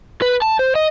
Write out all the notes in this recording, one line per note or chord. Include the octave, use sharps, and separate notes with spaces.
B4
A5
C5
D#5